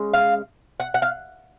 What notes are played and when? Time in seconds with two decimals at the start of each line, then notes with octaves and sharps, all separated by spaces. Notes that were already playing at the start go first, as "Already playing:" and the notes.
Already playing: C#3 G#3
0.14 F5
0.80 F#5
0.94 F#5
1.02 F5